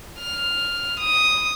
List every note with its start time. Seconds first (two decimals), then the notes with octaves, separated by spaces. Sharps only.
0.20 F6
0.99 D#6